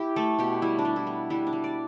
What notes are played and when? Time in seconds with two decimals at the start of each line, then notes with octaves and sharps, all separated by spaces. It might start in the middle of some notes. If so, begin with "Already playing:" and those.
Already playing: E4 G4
0.16 A3 A4
0.39 B2 G4
0.62 G3 E4
0.79 D4
0.85 G3
0.96 E4
1.07 B3
1.30 G3 E4
1.47 D4
1.53 G3
1.64 D5